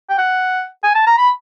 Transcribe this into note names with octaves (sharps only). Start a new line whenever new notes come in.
G5
F#5
G#5
A5
A#5
B5